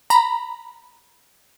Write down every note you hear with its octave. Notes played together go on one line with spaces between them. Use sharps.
A#5 B5